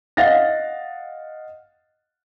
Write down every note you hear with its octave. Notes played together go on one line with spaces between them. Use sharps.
D#5 F5 F#5 A6 A#6